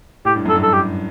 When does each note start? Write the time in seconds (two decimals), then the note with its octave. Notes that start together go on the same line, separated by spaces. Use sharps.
0.25 A2 G4
0.36 G2
0.45 F#2 A4
0.55 G2
0.63 A4
0.73 G4